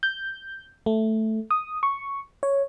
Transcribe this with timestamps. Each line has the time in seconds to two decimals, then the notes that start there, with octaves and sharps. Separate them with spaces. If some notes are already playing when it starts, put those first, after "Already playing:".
0.03 G6
0.86 A3
1.51 D#6
1.83 C#6
2.43 C#5